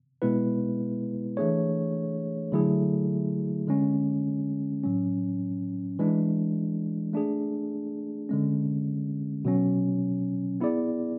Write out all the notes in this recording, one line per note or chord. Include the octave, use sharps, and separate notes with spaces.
B2 G#3 B3 E4 B4
E3 A3 D4 G#4 C#5
D3 F#3 A3 E4 G#4
D3 G#3 C#4
A2 F#3 C#4
E3 G#3 D4
A3 D4 G#4
D3 G#3 C#4
B2 F#3 C#4
B3 E4 G#4 D5